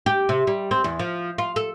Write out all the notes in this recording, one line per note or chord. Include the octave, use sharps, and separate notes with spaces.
G4
C3
G3
C4
E2
F3
F4
A4